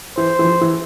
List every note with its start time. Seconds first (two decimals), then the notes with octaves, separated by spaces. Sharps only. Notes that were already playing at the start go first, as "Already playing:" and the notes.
0.17 E3 C5
0.39 E3
0.45 F3
0.61 E3